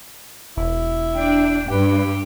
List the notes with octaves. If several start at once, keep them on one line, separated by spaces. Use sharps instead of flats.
E1 E4
D4 G5
G2 G4 B4